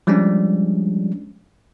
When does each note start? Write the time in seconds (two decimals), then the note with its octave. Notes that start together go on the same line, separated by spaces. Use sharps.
0.07 F3 G3 G#3 C#4 D4